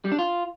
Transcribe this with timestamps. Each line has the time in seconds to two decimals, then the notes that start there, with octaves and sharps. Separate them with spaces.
0.05 G3
0.12 D4
0.19 F4